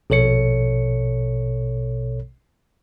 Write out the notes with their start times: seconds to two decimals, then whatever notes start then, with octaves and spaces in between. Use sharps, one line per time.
0.10 A#1 B2 A4 C#5 C#7